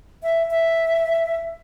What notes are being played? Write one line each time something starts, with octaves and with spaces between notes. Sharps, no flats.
E5
E5